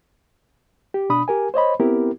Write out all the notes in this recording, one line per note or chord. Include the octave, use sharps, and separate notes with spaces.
G4
B2 D4 B5 D#6
G4 A#4 G#5
C5 C#5 D#5 B5
B3 C4 E4 G4 A#4